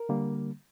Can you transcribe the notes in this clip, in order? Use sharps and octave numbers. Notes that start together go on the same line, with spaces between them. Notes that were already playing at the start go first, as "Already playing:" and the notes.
Already playing: A#4
D3 G3 A#3